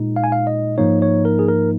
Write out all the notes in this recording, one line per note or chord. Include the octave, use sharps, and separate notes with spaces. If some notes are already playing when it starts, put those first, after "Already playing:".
Already playing: A#2 G#3 D#4
F5
G#5
F5
D#5
G#2 F3 A#3 D#4 C#5
C#5
A#4
G#4
A#4